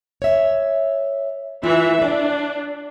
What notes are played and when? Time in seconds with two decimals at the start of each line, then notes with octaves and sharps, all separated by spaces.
0.22 C#5 E5
1.64 E3 F4 E5
2.02 D4 D5